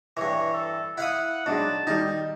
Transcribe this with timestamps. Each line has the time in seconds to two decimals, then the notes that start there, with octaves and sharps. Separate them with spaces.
0.17 G2 E3 C#5
0.54 A4
0.98 E4 F5 F#5 D#6
1.46 F#3 G#3 D4 D#4 A5
1.87 D#3 G3 D#4